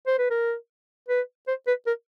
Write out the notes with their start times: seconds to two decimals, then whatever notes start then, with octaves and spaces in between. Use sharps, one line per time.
0.07 C5
0.18 B4
0.30 A#4
1.09 B4
1.48 C5
1.67 B4
1.87 A#4